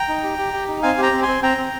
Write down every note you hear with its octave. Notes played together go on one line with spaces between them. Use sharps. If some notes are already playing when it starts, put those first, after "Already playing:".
Already playing: G5 A#5
D#4
G4
G4
G4
D#4
C4 F5 G#5
G4 G5 A#5
C4
G#5 C6
C4
C4 G5 A#5
C4